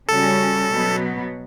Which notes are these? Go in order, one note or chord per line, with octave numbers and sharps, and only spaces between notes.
C#3 G3 C#4 F#4 A4
B2 F#3 B3